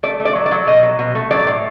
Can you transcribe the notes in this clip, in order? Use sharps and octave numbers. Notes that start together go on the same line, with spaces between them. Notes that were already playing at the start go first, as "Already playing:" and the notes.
A3 D5
A3
D5
F#3
D5
F#3
B2 D#5
F#3
B2
A3
F#3 D5
A2